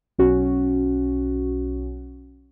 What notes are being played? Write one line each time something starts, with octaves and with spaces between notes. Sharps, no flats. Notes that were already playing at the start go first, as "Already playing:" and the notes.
B1 C#4 F#4